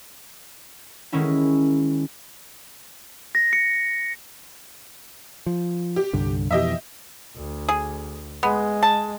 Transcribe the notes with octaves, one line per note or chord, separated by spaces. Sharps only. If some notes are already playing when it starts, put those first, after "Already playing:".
D#3 G#3 C#4 E4
A#6
C#7
F3
G4
C2 G2 D3
F2 B2 E3 G4 D#5 E5
D2
G#4
G#3 B3
A5